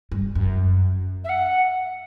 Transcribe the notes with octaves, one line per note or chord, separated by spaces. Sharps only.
G2
F#2
E5
F#5